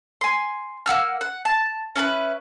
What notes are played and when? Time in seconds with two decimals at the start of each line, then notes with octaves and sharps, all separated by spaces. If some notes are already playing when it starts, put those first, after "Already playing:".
0.21 G#5 C6
0.86 A#3 F#5 E6 F6
1.21 F#5
1.45 A5
1.96 C#4 E4 A4 B4